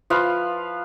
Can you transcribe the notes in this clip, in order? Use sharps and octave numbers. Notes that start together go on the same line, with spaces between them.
F3 B4 F5